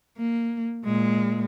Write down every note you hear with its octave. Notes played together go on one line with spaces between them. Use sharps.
A#3
A#2 G#3